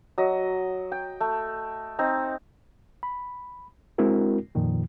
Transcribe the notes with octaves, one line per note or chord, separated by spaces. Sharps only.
F#3 D#5
G5
A3
C4 D#4
B5
G#3 C4 D4 E4 F#4 A#4
F2 A#2 D#3 F3